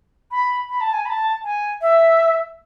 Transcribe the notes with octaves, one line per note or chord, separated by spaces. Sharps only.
B5
B5
A5
G#5
B5
A5
G#5
E5